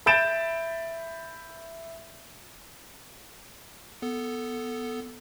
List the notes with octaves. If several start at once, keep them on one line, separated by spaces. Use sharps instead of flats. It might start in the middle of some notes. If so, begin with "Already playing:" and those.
E5 B5 G6 A6 D7 E7
B3 A4